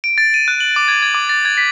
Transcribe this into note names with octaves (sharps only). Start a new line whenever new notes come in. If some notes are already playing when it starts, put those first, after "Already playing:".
D7
A6
D#7
F#6
F#7
D6
G#6
G#6
D6
A6
G#6
B6